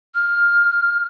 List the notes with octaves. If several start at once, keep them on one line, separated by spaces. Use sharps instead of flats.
F6